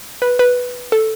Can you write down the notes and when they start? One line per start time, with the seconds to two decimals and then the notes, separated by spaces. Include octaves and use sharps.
0.22 B4
0.39 B4
0.92 A4